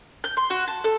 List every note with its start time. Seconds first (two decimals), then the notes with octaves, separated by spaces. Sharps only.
0.24 G6
0.37 C6
0.50 F#4
0.68 A5
0.84 A4